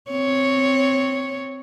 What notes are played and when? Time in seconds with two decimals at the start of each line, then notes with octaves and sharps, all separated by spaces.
0.11 C4 C#5